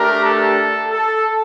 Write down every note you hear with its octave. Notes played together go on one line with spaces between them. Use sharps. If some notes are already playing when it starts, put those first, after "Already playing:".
Already playing: A3 D4 G4 A#4
A4
A4